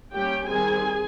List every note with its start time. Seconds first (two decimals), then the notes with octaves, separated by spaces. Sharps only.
0.14 G3 A#3 C#4 G4 G5
0.49 D#3 G3 C4 G#4 G#5